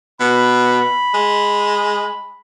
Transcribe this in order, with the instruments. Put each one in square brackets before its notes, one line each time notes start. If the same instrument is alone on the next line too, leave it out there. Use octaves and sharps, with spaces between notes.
[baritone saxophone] B2 [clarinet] B5
[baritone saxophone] G#3